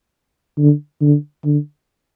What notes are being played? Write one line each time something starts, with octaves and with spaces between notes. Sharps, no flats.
D3
D3
D3